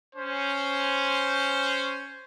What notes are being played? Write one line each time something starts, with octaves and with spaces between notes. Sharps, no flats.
C#4 C5